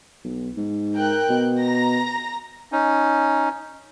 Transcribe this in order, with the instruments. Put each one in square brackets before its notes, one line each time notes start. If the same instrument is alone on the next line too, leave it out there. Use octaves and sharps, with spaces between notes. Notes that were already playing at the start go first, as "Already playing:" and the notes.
[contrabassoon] B1
G#2
[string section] A#4 G5 F#6
[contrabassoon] B2
[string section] A#5 A#6
[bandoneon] C#4 D#4